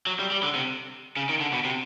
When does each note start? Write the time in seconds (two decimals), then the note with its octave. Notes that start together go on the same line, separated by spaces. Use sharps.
0.07 F#3
0.19 G3
0.32 G3
0.43 D3
0.55 C3
1.17 C#3
1.29 D#3
1.41 D3
1.53 B2
1.65 C3